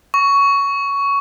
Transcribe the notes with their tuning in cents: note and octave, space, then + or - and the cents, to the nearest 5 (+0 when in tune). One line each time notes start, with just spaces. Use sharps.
C#6 +15